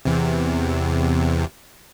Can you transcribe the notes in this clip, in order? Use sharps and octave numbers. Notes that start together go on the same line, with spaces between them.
E2 C3